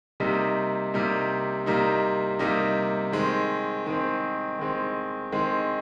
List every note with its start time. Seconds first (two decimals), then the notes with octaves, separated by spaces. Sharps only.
0.20 C3 G3 A#3 D#4
0.94 C3 G3 A#3 D#4
1.66 C3 G3 A#3 D#4
2.39 C3 G3 A#3 D#4
3.12 D#3 G#3 C4
3.86 D#3 G#3 C4
4.59 D#3 G#3 C4
5.32 D#3 G#3 C4